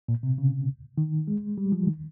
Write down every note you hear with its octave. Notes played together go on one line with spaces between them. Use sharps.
A#2
C3
C#3
D#3
G#3
G3
F3
D#3